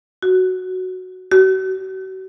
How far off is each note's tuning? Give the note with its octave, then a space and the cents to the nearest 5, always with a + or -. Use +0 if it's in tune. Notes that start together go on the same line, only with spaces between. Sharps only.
F#4 +0
F#4 +40